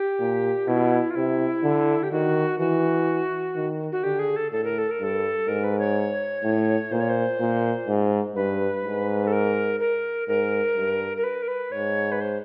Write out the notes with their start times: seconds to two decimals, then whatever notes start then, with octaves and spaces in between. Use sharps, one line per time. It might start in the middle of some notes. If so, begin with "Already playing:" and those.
Already playing: G4
0.20 A#2
0.68 B2 E4
1.11 F4
1.15 C3 E4
1.63 D3
2.03 G4
2.12 D#3 F#4
2.59 E3 F#4
3.56 D#3
3.92 F#4
4.03 D3 G4
4.19 G#4
4.36 A4
4.52 A2 A4
4.64 A#4
4.78 A4
4.91 A#4
5.00 G2 A4
5.48 G#2 A#4
5.64 B4
5.79 C#5
6.43 A2
6.92 A#2 C5
7.00 C#5
7.09 C5
7.40 A#2
7.87 G#2
8.36 G2 B4
8.84 G#2
9.27 A4
9.33 A#4
9.80 A#4
10.28 G#2 A#4
10.77 G2
11.17 A#4
11.24 B4
11.42 A#4
11.48 B4
11.72 G#2 C#5
12.12 B4
12.21 C5